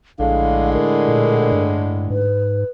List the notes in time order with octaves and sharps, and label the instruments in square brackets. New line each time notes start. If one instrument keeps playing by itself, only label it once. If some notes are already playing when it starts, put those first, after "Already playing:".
[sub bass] A#1 [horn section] A2 D3 G#3 [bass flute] F5
[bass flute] A#4
[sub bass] A#2
G2
[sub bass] G#2 [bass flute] B4